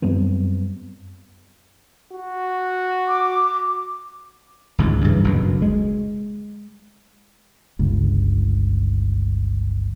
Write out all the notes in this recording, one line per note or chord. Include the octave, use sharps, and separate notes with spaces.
F#2 G3 B3 C4
F#4
D6
G#1 C#2 G#2
G2 C#3 E3
F#1 D2 B2
G#3
G1 C#2